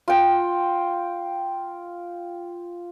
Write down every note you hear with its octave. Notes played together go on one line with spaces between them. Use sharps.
F4 G5